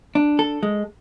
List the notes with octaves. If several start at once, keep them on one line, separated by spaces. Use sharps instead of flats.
D4
A4
G#3